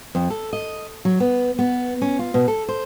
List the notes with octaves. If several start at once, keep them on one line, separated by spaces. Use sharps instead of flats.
F2
A4
D#5
F#3
B3
B3
C#4
F4
B2
A4
C5